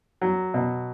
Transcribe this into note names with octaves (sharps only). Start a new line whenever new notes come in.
F#3
B2